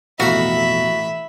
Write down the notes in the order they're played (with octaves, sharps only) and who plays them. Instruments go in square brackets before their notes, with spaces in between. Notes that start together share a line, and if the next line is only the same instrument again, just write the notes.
[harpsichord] A1 F5 A#5 [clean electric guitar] F2 B2 [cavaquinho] F#4 [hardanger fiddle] E5 B5